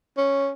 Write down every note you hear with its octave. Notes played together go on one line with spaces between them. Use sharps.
C#4